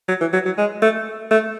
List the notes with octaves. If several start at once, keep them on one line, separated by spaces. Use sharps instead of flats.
F#3
E3
F#3
F#3
G#3
A3
A3